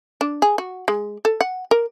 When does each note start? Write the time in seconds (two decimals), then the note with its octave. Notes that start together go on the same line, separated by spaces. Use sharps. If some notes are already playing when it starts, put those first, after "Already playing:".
0.21 D4
0.42 G#4
0.58 F#4
0.88 G#3
1.25 A4
1.41 F#5
1.71 A#4